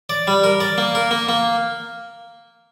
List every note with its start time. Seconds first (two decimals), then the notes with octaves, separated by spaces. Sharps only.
0.10 D5
0.27 G3
0.44 A#4
0.60 D5
0.78 A#3
0.95 A#4
1.11 A#3
1.29 A#3